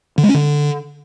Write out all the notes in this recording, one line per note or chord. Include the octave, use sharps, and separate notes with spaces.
D3
G#3
C#4
D3